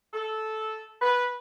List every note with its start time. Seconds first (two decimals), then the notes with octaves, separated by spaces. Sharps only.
0.14 A4
1.01 B4